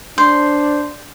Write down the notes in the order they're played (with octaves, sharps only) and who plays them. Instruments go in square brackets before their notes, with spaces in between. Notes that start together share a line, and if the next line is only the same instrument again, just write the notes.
[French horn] D4 [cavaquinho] C5